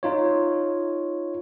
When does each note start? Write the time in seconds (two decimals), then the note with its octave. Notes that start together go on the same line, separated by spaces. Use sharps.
0.03 D#4 F4 C#5